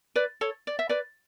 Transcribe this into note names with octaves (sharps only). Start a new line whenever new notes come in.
B4 D5
A4 C#5
D5
E5
B4 D5